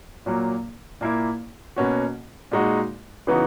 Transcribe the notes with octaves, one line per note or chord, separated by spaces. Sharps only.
A#2 F#3 A#3
A#2 A#3 E4
B2 A#3 C#4 F#4
A#2 G#3 D#4 F#4
C#3 E3 B3 D#4 F#4